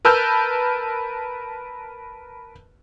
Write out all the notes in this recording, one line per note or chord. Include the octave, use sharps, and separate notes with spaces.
A#4 B4 A5 E6 F6 G6